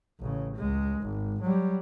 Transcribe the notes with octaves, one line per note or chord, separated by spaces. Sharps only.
A1 C#3
C#2 G#3
G#1
F#3 G3